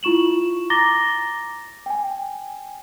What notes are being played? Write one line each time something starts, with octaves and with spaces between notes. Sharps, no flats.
E4 F4 C#6 E7 F#7
A#5 D6 A6 A#6 G7
G5 G#5